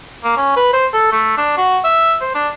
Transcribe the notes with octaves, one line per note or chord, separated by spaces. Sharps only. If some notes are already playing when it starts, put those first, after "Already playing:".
A#3
C#4
B4
C5
A4
A3
D4
F#4
E5
C5
D4